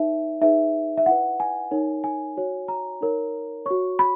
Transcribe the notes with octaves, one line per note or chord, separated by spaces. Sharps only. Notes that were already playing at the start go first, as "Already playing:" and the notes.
Already playing: D#4 A#4 C#5 E5
D#4 G#4 B4 E5
E5
E4 B4 F#5
G#5
D#4 A#4 C#5
G#5
F#4 C#5
A#5
D#4 A#4 C#5
F#4 C#5 C#6
B5